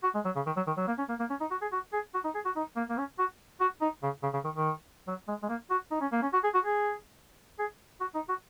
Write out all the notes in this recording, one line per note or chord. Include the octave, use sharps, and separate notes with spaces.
F#4
G#3
F#3
C#3
D#3
F#3
D#3
F#3
A#3
C#4
A#3
A#3
C#4
D#4
F#4
G#4
F#4
G#4
F#4
D#4
G#4
F#4
D#4
A#3
A#3
C#4
F#4
F#4
D#4
C#3
C#3
C#3
D#3
D#3
F#3
G#3
G#3
A#3
F#4
D#4
C#4
A#3
C#4
F#4
G#4
F#4
G#4
G#4
F#4
D#4
F#4